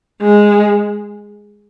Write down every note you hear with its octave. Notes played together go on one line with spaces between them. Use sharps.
G#3